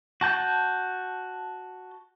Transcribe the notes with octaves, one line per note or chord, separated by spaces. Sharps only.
F#4 A5 G6